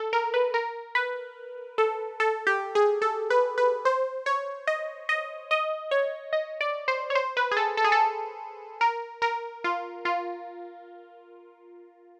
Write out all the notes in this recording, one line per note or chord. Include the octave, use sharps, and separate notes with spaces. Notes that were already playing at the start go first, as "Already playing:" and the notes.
Already playing: A4
A#4
B4
A#4
B4
A4
A4
G4
G#4
A4
B4
B4
C5
C#5
D#5
D#5
D#5
C#5
D#5
D5
C5
C#5
C5
B4
G#4
A4
A4
G#4
A4
A#4
A#4
F4
F4